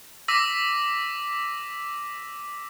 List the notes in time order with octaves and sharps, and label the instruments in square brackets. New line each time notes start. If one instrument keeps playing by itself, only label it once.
[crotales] D6 E6 A#6 B6 D#7